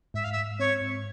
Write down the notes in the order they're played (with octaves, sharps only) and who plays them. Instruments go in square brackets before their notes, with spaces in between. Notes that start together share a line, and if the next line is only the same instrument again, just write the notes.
[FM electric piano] G#2 [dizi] E5
[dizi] F5
E5
[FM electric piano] G#2
[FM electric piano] C4 [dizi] C#5
[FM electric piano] G#2